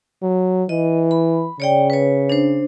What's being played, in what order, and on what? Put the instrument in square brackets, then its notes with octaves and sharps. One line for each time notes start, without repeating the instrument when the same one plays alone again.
[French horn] F#3
[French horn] E3 [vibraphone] D#5
[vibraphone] B5
[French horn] C#3 [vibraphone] C#5 D5 G5
[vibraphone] B4 C#5
D4 C5